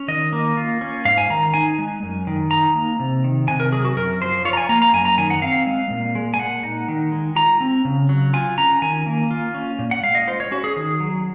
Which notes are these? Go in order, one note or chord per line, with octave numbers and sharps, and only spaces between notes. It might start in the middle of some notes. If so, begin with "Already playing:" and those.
Already playing: C#4
D#3 D#5
A#3
F4
C#4
G#2 F5
G#5
D#3 A#5
D#4 G#5
G#3
F#2
D#3
D#4 A#5
A#3
C3
D#3
C3 G#5
A#4
F#3 G#4
F#4
F#2 A#4
F3 C5
F4 C#5
A#5
G#5
A#3 A#5
A#5
F#2 G#5
A#5
D#3 G#5
F#5
C4 F5
G#3
A#2
G#3
G#5
A#2 F#5
D#4
D#3
G#3
F4 A#5
C4
C#3
F#3
F4 G#5
C#4 A#5
D#3 G#5
A#3
F4
C#4
A#2
F#5
G#3 F5
D#5
F4 C5
C#5
C#4 F#4
G#4
D#3
F#3